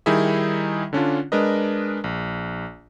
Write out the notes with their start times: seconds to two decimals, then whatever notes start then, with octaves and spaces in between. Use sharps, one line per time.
0.06 D#3 G3 D#4 E4 G#4 E5
0.93 D3 C#4 D4 F4
1.32 G#3 D4 A#4 B4 D#5
2.04 A#1